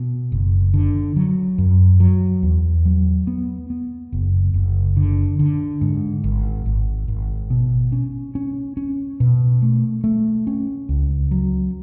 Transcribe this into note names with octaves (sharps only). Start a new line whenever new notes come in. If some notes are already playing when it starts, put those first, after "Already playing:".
Already playing: B2
F#1
D3
F#3
F#2
F#3
E2
F#3
B3
B3
F#1
F#1
D3
D3
G#2
G#1
G#1
G#1
B2
C#4
C#4
C#4
B2
A3
A3
C#4
C#2
F#3